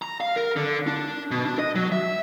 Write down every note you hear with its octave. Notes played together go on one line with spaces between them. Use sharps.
A#5
F5
A#4
D3
D4
B2
D4
D#5
F#3
E5